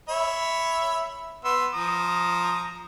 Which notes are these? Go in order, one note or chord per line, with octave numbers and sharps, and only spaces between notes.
C#5 E5 B5
B3 C6 E6
F3 A#5 D#6